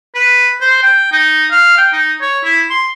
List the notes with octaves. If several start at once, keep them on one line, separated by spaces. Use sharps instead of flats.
B4
C5
G5
D#4
F5
G5
D#4
C#5
E4
C6